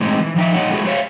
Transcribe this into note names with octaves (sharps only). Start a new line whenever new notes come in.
A2 G#3 C4 D#4
E3
F3 D#4 E5
G3 A#3 D#4 C#5 D#5 F#5
G#3 A3 B3 E4 F#4 G#4
F4 F#4 C5 C#5 E5 F5